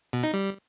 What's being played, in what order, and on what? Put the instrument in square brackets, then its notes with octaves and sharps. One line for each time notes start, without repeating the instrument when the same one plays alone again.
[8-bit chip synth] B2
D#4
G3